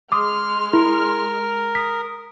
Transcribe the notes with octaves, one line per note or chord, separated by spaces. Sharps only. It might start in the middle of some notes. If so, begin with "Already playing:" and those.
G#3 C6 D6 D#6 F6
E4 A#4
D#6 B6